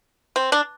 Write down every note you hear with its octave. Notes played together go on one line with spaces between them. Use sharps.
C4
D4